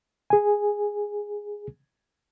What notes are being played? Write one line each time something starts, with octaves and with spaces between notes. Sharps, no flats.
G#4 G#5